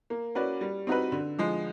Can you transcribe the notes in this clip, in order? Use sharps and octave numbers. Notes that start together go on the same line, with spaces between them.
A#3
C#4 F#4 B4 D5
G3
C4 D#4 F#4 B4
D3
F3 G#3